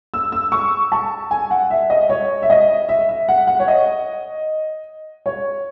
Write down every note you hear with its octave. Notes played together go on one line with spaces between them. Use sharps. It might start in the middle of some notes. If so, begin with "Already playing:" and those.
E6
E6
C#6
A5
G#5
F#5
E5
D#5
C#5
E5
D#5
E5
E5
F#5
F#5
C#5
D#5
C#5